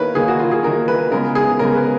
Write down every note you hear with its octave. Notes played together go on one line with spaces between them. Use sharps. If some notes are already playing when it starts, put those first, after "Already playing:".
Already playing: D#3 A#3 A#4 B4 C#5
D#3 A#3 G#4
F#4
F4
G#4
D#3 A#3 A#4
B4
C#3 G#3 B3 A#4
G#4
C#3 G#3 B3 A#4
B4